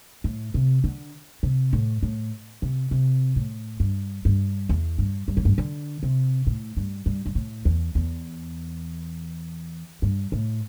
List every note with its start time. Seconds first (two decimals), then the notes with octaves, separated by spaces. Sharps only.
0.24 A2
0.54 C3
0.84 D3
1.43 C3
1.73 A2
2.03 A2
2.62 C3
2.91 C3
3.36 A2
3.80 G2
4.25 G2
4.69 E2
4.98 G2
5.28 G2
5.37 A2
5.45 G2
5.58 D3
6.03 C3
6.47 A2
6.77 G2
7.06 G2
7.26 G2
7.35 A2
7.65 E2
7.95 E2
10.02 G2
10.32 A2